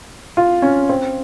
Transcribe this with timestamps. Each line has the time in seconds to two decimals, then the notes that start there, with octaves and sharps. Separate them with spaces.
0.37 F4
0.62 C#4
0.89 C4